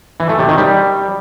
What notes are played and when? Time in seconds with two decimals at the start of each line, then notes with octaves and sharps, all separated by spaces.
0.20 E3
0.29 A3
0.39 C3
0.48 D#3
0.58 G3